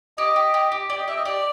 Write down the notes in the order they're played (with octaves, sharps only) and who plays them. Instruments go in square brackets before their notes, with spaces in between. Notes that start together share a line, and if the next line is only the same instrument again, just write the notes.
[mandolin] G4 [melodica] D#5
[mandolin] G4
G4
G4
[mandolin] G4 [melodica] D5
[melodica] D#5
[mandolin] G4 [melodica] E5
[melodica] D#5
[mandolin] G4 [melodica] D5